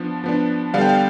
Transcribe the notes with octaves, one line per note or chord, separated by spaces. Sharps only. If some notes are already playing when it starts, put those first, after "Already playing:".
Already playing: F3 B3 D4
F3 B3 D4
D3 G3 B3 D4 F5
G5
F5